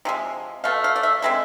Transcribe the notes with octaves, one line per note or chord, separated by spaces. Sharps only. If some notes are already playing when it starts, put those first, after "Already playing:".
C3 F3 G#3
B2 A3 F5
F5
D5
E5
D3 G#3 C4 E5